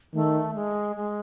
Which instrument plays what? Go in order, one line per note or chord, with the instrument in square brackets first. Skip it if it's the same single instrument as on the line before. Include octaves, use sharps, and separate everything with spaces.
[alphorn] D#3 [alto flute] A3
[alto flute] G#3
G#3